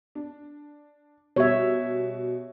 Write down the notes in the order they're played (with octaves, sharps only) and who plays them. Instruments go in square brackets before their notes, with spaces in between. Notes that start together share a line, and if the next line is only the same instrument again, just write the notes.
[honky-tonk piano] D4
[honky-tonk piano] B2 G3 [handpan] C#5 E5